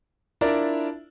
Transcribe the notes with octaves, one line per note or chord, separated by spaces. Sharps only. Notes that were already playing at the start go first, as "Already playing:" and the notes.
D4 E4 F4 A#4 D5